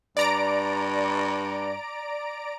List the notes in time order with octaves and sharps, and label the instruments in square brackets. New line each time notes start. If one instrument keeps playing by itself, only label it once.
[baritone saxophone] G2 [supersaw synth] D5 A#5 D7